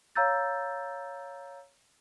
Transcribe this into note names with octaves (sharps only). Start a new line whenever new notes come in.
C#5 F5 A#5 E6 G6 A6